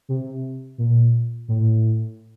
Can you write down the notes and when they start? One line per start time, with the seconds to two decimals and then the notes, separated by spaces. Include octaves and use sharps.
0.09 C3
0.78 A#2
1.48 A2